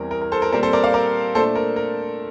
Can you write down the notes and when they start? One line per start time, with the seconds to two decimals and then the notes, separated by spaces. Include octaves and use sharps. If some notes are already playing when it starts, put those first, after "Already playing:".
Already playing: E2 E3 G3 C4 A#4
0.11 A#4
0.22 A#4
0.32 A4 C5
0.42 A#4
0.52 A#2 G3 C4 A#4
0.63 A4 C5
0.73 A#4 D5
0.83 D5 F5
0.94 A#4 D5
1.35 A#2 A3 D4 A4 C5
1.55 A#4
1.76 A#4